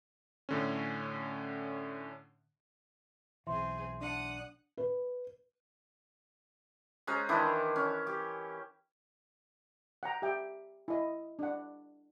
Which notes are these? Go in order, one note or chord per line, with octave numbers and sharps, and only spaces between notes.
A2 D3 C#4
B1 E3 C4 G#4 E5 C6
D4 F#5 D#6
B4
G#3 C#4 C5 A#5
D#3 E3 D4 E4
C#4
G4
F#5 G5 A#5
G4 E5 G5
E4 D#5
D4 F#5